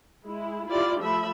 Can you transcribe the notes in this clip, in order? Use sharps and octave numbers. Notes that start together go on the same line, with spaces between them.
G#3 E4
E4 F4 G4 D5
F3 A3 E5 B5